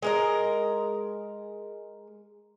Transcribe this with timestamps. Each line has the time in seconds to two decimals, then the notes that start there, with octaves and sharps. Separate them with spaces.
0.02 G#3 A#4 D#5